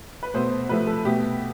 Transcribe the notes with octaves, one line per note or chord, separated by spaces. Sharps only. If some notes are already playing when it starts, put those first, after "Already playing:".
B4
B2 A3 C5
C3 F3 A3 B4
A4
B2 A3 G4